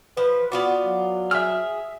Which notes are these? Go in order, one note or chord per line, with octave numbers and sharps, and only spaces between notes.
F3 B4
B3 F4 F#4 D5
F#3
G#4 E5 F6